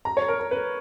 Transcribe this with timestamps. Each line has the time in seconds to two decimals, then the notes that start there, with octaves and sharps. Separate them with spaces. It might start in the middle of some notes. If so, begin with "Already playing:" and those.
0.05 A#5
0.17 C#5
0.28 A#4
0.40 A#4
0.51 B4